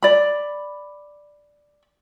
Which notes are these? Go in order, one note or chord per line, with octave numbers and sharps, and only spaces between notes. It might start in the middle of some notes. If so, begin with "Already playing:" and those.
D5 B5